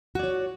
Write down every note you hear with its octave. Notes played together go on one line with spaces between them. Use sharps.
F#4 C#5 D5